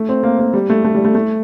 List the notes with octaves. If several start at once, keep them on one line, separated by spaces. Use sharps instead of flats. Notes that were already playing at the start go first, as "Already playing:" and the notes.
Already playing: A3
C4
A#3
A#3
G3
A3
A3
G3
A3
A3